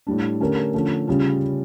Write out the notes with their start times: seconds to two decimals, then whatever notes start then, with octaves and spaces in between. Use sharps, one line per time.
0.07 A2 G3 D4
0.40 D3 A3 C#4 G4 A#4
0.74 D3 F3 A3 C#4
1.08 C#3 G3 C#4 F4